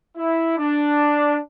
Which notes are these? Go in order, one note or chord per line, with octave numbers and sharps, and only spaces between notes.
E4
D4